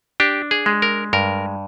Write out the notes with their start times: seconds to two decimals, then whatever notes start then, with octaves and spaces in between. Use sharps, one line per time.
0.20 D4 G4
0.51 G#4
0.66 G#3
0.82 A#4
1.13 G2 A#4